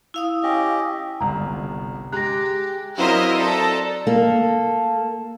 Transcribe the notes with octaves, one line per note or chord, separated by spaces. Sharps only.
E4 F5 D#6
C#4 G4 D#5
G1 C2 A#5
G#3 G4 A#5 F#6 A#6
F#3 C4 E4 F#4 A#4 C5 D#5 F5
A4 D5 A#5
A#3 A4